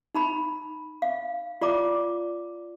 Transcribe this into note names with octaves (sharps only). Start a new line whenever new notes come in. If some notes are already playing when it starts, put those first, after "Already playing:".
D#4 A#5 B5
F5
F4 D5 A#5 D6